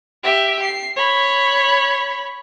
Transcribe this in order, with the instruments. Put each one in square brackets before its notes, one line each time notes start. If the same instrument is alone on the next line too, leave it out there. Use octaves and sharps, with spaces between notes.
[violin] G4 E5
C7
C#5 B5